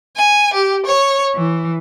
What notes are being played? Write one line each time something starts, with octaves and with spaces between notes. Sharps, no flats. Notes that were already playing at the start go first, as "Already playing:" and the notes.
G#5
G4
C#5
E3